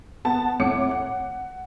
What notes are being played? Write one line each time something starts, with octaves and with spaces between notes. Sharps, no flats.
B3 A5
F2 A2 C#5 F#5 D6 C#7
F#5